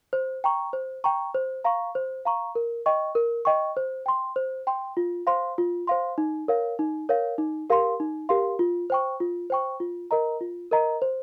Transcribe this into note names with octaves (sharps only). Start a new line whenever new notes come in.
C5
G5 A#5 C#6
C5
G5 A#5 C#6
C5
F5 A#5 C#6
C5
F5 A#5 C#6
A#4
D#5 G5 C#6
A#4
D#5 G5 C#6
C5
G5 C6
C5
G5 C6
F4
C5 F5 C6
F4
C5 F5 C6
D#4
A#4 C#5 F5
D#4
A#4 C#5 F5
D#4
G4 A#4 F5 C6
D#4
G4 A#4 F5 C6
F4
C5 G5 C#6
F4
C5 G5 C#6
F4
A#4 D#5 A#5
F4
A#4 D#5 A#5
C5